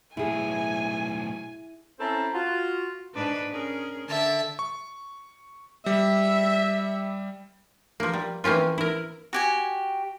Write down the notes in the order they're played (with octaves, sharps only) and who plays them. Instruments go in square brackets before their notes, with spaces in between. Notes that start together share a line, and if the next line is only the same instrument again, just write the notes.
[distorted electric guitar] B1 A2 [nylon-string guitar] E4 G#4 [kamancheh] G#5
[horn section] C4 C#4 E4 A4 A5 A#5
F4 F#4
[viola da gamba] G#2 D4 B4
C#4 G#4 A#4
[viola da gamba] D3 [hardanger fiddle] E5 A5
[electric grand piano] C#6
[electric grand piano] G3 [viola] E5
[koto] F3 A#3
G3
E3 A#3 C4 C#4 F4
E4 A#4
[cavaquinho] F#4 G4 G#5